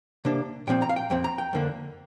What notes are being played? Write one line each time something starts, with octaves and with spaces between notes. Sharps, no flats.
C3 A#3 D4
A#2 F3 C4 G5
A#5
F5
G5
F2 F3 C4 G5
A#5
G5
F2 D3 A#3 D4